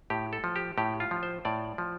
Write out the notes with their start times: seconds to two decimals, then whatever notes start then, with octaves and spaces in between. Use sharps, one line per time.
0.10 A2 G4
0.33 A4
0.44 F3
0.56 G4
0.78 A2 G4
1.00 F4
1.11 F3
1.23 C5
1.45 A2 D5
1.78 F3